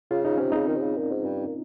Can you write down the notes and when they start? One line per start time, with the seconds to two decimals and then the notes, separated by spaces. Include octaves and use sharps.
0.11 C#3 F4
0.25 C#3 D#4
0.38 C3 C#4
0.52 C#3 C4 D#4
0.67 D#3
0.76 C3
0.82 C#3
0.97 A#2
1.11 G#2
1.25 G2
1.47 A#2